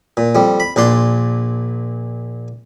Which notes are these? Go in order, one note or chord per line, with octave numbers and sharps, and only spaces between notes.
A#2
F2 G3
B5
A#1 A#2 D4 C6